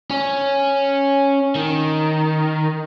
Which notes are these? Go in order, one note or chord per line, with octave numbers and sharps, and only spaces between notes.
C#4
D#3